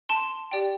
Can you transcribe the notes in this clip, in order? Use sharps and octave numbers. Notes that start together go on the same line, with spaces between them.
A5 C6
G4 D5 G5